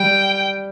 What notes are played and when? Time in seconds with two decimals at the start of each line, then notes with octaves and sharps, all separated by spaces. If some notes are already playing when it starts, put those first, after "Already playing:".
Already playing: G3 G5